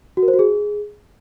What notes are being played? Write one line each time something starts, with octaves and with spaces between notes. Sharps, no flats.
F#4
A#4
C5
F#4
G#4